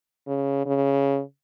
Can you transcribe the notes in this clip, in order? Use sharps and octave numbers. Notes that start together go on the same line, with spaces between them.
C#3
C#3